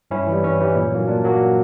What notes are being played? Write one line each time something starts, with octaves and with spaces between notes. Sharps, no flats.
G2 C#4 E4
E3
G3
G2 C#4
E3 G3
A#2
F#3 A#3
A#2 D4
F#3 A#3